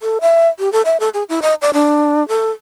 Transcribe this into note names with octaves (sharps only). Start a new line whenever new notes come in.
A4
E5
G4
A4
E5
A4
G#4
E4
D#5
D5
D4
A4